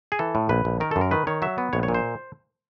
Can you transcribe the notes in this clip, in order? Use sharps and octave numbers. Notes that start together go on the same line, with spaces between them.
G#4
E3 A4
A2
A#1 B4
A#1
D#3 A#4
A4
F#2
A#4
D#3 B4
D#3 C#5
F#3 E5
B3
A#1 C#5
C#5
A#2
C5